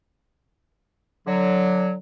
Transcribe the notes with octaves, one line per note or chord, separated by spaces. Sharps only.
D3 F#3